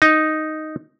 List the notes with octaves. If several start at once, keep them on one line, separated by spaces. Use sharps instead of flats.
D#4